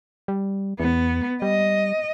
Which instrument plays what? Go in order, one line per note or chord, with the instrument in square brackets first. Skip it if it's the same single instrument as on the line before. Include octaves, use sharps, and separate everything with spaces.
[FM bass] G3
[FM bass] E2 [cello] B3
[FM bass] G3 [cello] D#5